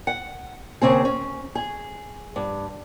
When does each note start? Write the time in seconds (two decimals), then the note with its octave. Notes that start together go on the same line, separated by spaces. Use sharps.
0.07 F#5
0.81 D#2 C#3 C4 G#4
1.05 C#4
1.55 G#4
2.36 G2